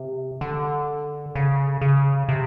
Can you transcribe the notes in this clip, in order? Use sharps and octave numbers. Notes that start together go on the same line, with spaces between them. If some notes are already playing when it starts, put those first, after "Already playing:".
Already playing: C3
D3
C#3
C#3
C3